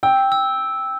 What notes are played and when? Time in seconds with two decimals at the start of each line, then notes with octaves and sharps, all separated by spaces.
0.03 G5 E6
0.32 E6